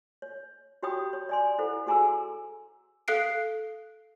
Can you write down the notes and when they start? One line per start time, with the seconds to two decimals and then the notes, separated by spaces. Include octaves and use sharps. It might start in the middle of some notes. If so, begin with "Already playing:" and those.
0.22 C#5
0.83 F#4 G4 C#5 G5 B5 D#6
1.13 C#5
1.29 D5 G#5 C6
1.58 E4 A4 C5 F#5
1.87 F#4 G#4 G#5 A#5 C6 E6
3.08 A4 F5 F#6 C7 D7